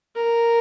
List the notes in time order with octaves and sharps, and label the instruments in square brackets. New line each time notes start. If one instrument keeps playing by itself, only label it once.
[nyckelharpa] A#4